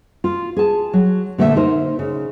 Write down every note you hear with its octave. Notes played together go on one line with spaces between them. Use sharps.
F4
G#4 A5
F#3
A#2 D3 A3 C#5 E5
D#4 A#4 C5
C#3